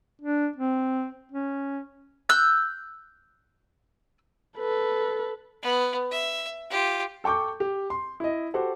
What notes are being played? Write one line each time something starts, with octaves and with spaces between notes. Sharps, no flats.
D4
C4
C#4
E6 F#6 G6
A4 B4
B3
E5
F4 G4
A4 G5 C#6 D6 G6
G4
C6
E4 D#5
F#4 G4 A4 C5 F#5